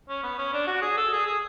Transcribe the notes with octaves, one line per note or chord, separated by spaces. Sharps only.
C#4
B3
C#4
D4
F#4
G#4
A4
G#4
G#4